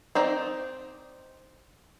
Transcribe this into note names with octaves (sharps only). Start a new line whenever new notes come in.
C4 D#4 D5